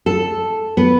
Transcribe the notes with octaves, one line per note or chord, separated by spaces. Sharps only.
A4
B3